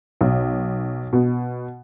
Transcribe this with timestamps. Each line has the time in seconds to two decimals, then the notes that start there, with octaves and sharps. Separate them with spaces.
0.21 B1
1.13 B2